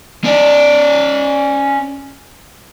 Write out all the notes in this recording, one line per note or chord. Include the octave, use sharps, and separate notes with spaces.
C#4 D5